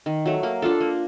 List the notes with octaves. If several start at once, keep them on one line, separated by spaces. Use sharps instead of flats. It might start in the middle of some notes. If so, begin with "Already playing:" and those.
D#3
F#3 A3
A#3
D4 F4 A4
A#3